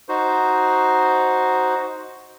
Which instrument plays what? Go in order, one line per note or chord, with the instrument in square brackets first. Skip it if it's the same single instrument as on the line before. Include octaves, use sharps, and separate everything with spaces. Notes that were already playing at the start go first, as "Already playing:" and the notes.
[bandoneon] D#4 F#4 C5